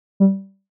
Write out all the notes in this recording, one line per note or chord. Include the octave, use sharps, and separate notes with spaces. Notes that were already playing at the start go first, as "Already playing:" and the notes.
G3